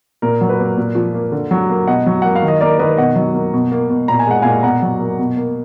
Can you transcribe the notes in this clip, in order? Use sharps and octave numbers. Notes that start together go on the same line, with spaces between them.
A#2 A#4
F#3
B4
A#3
A#2
F3
A#3
D3
F#3
A#3
B2 D#5 F#5
F#3
A#3 F#5
F5
D#3
D#5
A#3 A#4 D5
D#3 B4 D#5
B2 D#5 F#5
F#3
A#3
B2
A#3
B2
A#2 A#5
G#5
G#3 F#5
A#2 F5 G#5
B2 F#5 A#5
F#3
A#3
B2
A#3